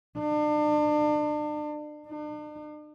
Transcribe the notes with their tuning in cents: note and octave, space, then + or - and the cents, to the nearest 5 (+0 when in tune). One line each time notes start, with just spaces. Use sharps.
D4 +35
D4 +45